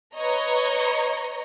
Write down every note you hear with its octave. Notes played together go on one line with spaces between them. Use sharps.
B4 C#5 D#5 A#5